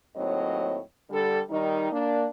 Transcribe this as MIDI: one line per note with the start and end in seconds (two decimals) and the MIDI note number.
0.16 0.79 39
0.16 0.79 45
0.16 0.79 54
0.16 0.79 60
0.16 0.79 73
0.16 0.79 75
1.10 1.39 50
1.10 1.39 55
1.10 1.39 69
1.50 1.86 51
1.50 1.86 55
1.50 1.86 63
1.91 2.25 58
1.91 2.25 62